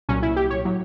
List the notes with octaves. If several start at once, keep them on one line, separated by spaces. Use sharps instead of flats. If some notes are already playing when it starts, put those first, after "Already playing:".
C2 A#2 F#3 C#4
E4
G4
C#5
A2 F#3